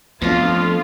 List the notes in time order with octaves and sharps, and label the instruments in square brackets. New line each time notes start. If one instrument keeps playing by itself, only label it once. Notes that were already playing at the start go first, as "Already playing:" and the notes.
[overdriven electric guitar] F2 [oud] F3 A3 D4 [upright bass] B3 [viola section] F4